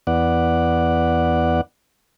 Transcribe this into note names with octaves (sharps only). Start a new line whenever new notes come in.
E2 B3 D5 F#5